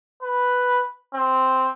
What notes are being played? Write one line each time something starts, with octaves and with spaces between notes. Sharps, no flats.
B4
C4